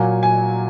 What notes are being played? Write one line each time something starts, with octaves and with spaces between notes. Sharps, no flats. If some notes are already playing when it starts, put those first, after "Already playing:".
Already playing: A#2 F#3 A#3 G#5
G#5